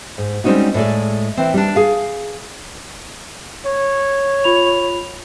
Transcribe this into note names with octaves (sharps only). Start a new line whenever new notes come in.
G#2
G3 G#3 C4 C#4 D#4 F#4
A2 G#3 A4 D5
E3 C4
G3 D4
G#4 F5
C#5
F4 B5 F7